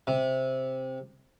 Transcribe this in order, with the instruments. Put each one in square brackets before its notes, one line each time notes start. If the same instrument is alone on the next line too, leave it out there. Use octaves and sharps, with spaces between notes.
[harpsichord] C3